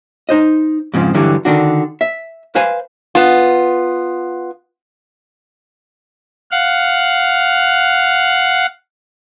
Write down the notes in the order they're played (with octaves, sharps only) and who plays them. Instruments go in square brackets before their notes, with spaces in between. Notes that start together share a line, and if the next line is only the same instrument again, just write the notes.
[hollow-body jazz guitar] D#4 C5 D#5
F2 G#2 C#3 F3
G2 D3 E3 F#3 G3
D3 D#3 D4 F#4
E5
B4 C5 F5 G#5
[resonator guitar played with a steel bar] B3 F4
[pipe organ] F5 F#5